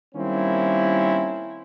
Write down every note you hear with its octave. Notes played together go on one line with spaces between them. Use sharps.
D#3 G3 A#3 C4 C#4 E4